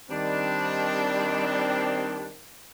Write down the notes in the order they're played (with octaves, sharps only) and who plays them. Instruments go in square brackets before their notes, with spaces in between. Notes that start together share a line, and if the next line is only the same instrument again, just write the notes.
[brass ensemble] D#3 C4 [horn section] G3 D4